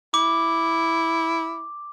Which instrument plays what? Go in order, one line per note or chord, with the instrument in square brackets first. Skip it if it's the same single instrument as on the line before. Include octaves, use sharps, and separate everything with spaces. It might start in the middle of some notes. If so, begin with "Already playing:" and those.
[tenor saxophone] E4 [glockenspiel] D6